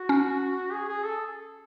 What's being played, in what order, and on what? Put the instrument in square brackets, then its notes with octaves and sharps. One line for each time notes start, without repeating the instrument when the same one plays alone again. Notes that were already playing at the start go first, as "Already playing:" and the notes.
Already playing: [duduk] F#4
[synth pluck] C#4
[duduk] G#4
G#4
A4